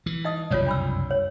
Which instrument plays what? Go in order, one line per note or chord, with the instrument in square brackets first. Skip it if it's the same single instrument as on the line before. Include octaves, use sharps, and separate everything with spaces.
[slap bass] E3
[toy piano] D#4 D#5 D#6
[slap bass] F#1 C2 F2 [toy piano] F4 C#5 D5
[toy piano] D4 B5 E6
C#5